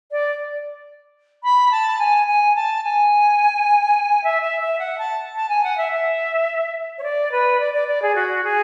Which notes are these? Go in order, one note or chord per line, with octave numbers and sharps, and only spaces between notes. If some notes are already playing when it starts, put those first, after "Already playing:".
D5
B5
A5
G#5
G#5
A5
G#5
E5
E5
E5
F#5
A5
A5
G#5
F#5
E5
E5
C#5
D5
B4
D5
D5
D5
G#4
F#4
G#4